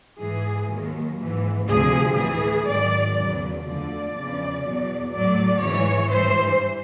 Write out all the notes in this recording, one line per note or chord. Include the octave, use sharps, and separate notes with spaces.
G#2 E3 G#4
D#2 D#3 F#3
G#2 E3
D2 C3 F3 G#4
A2 E3 G#4
G#2 D#3 F#3 D5
E2 C#3 F#3
D2 D3 F3 D5
E2 C#3 F3
E2 B2 F#3
A2 F#3 D5
G#2 E3 C#5
G2 E3 C5